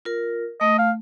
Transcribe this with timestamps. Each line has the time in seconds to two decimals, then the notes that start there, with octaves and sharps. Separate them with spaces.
0.05 F4 A#4
0.61 A3 D#5
0.79 F5